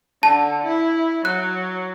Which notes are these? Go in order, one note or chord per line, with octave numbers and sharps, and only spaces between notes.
D3 A5
E4
F#3 F#6